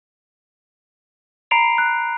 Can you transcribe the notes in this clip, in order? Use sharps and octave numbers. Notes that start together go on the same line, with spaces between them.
A#5 B5 C7 D7 F7
F#6